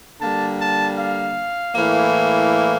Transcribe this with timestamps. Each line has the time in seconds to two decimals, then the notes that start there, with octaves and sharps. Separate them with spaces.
0.21 D3 G3 A#3 A5
0.60 A5
0.98 F5
1.74 A2 E3 A#3